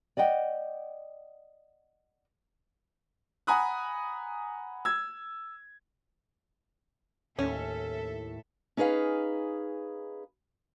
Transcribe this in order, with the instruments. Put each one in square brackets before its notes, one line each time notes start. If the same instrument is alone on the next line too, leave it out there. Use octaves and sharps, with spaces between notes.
[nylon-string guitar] D5 D#5 F#5 G5
[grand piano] F#5 G#5 A#5 B5 D#6 F#6
E6 G#6
[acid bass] D#2 [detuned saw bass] A2 [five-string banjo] C#4 [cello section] A4 E5
[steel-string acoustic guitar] C#4 D#4 G#4 B4 F5